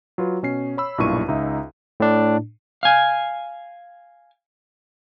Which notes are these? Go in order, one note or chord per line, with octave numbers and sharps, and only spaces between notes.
F#3 F4 B4
B2 C#4 C7
C#5 B5 E6
B1 G2 A#2 E4 C#6 D#7
C#2 D#4 E5
A2 D4
F5 G#5